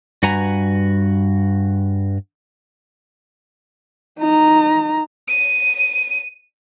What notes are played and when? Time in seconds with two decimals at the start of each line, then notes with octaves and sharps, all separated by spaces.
0.23 G2 F#4 B4 G#5 A#5
4.19 D#4 A#5
5.28 D#7